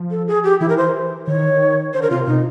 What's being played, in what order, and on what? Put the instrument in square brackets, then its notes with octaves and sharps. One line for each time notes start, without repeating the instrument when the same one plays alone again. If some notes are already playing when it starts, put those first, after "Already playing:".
Already playing: [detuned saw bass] F3
[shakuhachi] A4
G#4
G4
[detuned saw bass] E3 [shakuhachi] E4
[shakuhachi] A#4
C5
[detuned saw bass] D#3 [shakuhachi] C#5
[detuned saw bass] D3 [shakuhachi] C5
[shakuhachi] A#4
[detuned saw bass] C3 [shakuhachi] F4
[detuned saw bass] B2 [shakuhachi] D#4